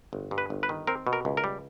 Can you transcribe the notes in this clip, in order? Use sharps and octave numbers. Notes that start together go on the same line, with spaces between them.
G1
G2
B4
G1
B4
D#3
C4 A#4
B2
A#4
C#2
A#4
G3